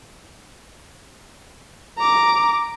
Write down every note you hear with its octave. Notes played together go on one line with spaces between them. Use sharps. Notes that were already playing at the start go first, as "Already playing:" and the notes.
A#5 D6